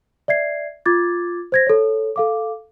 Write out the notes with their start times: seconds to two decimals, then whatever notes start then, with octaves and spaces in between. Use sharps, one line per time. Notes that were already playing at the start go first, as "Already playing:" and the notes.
0.28 D5 E5 G#6 C7
0.86 F4 D6 G#6 A6
1.52 C5 G#6 A#6
1.67 A4 C#5
2.16 A4 F5 D6